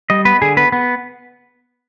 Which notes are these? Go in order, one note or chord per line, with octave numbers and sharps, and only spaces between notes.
G3 D#5
B3 B4
D3 G#4
B3 B4
B3